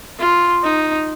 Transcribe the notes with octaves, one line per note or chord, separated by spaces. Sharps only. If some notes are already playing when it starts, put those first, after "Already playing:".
F4
D#4